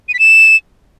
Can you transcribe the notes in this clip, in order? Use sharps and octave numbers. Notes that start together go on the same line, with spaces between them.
D#7
B6
E7